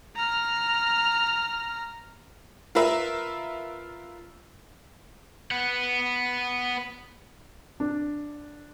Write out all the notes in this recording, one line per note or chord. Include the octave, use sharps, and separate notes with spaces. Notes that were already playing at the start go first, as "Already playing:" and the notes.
A#5 F6
F4 A#4 B4 E5
B3 F#5
D4